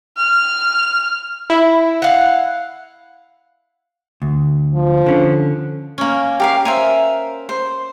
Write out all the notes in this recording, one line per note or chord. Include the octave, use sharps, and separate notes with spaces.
F6
E4
F5 F#5
D2
F3
D3 C#4
A#3 C#4
G4 A#4 F5
A#4 C5 E5 G#5
C5